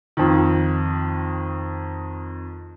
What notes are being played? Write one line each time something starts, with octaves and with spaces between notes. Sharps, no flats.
F2 D#3